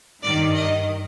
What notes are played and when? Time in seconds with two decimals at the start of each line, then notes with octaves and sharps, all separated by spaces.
0.23 G2 D#3 D5
0.54 D#5